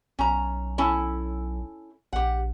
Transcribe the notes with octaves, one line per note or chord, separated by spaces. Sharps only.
B1 C#4 A#5
C#4 E4 A4
A#1 G4 F#5